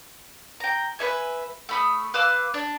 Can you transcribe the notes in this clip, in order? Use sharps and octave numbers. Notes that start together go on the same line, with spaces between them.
G5 A#5
B4 C#5 E5 G#5
A3 B5 D#6
B4 F5 D6 E6
D4